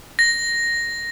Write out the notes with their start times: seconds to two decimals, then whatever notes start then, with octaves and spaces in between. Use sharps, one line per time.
0.19 A#6